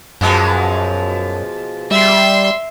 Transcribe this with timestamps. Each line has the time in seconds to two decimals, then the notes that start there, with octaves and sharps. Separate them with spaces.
0.21 F#2 B2 F3 G#3
1.91 G3 E5 C6